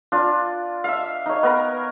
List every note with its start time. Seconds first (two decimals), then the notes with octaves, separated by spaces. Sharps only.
0.12 D4 F4
0.84 E5 F5
1.26 D#4 C#5
1.43 B3 A#4